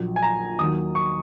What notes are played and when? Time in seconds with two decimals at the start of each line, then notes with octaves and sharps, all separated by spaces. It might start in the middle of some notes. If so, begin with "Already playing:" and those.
Already playing: A#1 A#2 F#3
0.16 G#5
0.23 A#5
0.59 D#2 D#3 F#3 D#6
0.95 C#6